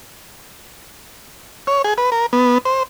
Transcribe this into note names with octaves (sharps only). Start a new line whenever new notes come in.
C#5
G#4
B4
A#4
B3
C5